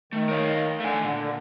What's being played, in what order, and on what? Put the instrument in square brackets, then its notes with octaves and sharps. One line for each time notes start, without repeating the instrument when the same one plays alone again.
[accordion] D#3 [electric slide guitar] A3
[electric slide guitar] A#4 C#5 F5
[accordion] D3 [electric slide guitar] A3 G#5
[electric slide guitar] A#2 [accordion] D3